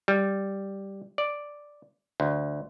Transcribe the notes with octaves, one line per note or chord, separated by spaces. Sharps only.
G3
D5
D2